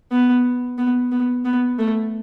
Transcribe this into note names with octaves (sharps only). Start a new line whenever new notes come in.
B3
B3
B3
B3
A3